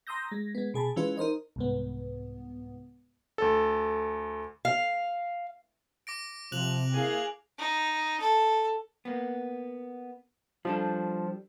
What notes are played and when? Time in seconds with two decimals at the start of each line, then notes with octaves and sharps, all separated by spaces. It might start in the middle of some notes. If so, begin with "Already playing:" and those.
0.07 A#5 C6 D#6 E6 G6 A#6
0.28 G#3 A#6
0.55 G#3 B3
0.74 B2 G#4 A5 B5
0.96 E3 G#3 C#4 F4 B4
1.17 D#4 A#4 C5 D#5
1.56 C2 G#2 B3
3.38 D2 A4
4.65 F5
6.07 D6 A#6 D7
6.52 C3 F3 F#6 F7 F#7
6.93 A#3 E4 G#4 F5
7.58 D#4
8.20 A4
9.05 A#3 B3
10.65 F3 G3 D4 A4